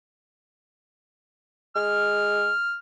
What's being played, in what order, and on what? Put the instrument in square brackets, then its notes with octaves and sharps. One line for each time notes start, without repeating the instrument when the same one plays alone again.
[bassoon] G#3 [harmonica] F6